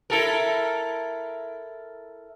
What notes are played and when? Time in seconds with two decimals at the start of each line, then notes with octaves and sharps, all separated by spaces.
0.10 E4 A4 A#4